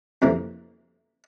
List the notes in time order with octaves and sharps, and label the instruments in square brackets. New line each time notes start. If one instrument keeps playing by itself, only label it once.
[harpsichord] F2 C3 E3 F3 A#3